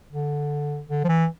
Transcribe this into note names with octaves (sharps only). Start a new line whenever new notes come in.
D3
D3
F3
E3